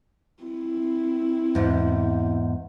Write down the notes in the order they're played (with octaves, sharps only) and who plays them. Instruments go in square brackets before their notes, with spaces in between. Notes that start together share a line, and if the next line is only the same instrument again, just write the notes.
[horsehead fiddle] C4 E4
[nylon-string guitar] E2 G#2